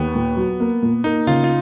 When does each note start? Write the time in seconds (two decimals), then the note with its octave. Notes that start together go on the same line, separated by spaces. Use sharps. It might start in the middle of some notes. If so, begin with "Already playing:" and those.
Already playing: D#2 B3
0.15 A#2
0.37 F#3
0.60 A#3
0.82 A#2
1.04 A#3 D#4
1.27 C#3 F4
1.44 F4